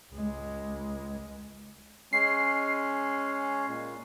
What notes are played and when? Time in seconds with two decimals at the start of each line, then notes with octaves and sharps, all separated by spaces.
0.13 C#2 G#3
2.13 G#3 C#4 C7
3.67 A#2